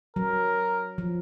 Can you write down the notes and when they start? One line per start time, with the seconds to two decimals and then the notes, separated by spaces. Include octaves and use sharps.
0.16 F#3 A#4
0.98 F3